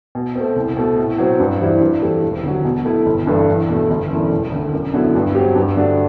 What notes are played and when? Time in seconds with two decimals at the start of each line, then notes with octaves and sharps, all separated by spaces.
0.15 B2
0.35 A3 C4
0.56 C2
0.77 B2 A3
0.98 A2
1.18 F#3 C4
1.40 G2
1.60 E3 G3 C4 E4
1.81 G2
2.02 E3 A3 C4 G4
2.23 E1
2.43 D2 D3 F#3
2.65 B2
2.85 A3 E4
3.06 G1
3.27 G2 E3 A3 D4
3.48 E2
3.69 B2 A3
3.90 G1
4.10 F#2 E3 A3 D4
4.31 E1
4.52 D2 D3
4.73 F#2
4.94 D3 F#3 B3 E4
5.15 G2
5.35 F#3 C4 G4
5.56 G2
5.77 D3 A3 D4 F#4